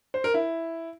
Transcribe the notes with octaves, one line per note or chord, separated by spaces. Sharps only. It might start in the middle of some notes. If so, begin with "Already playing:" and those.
C5
A#4
E4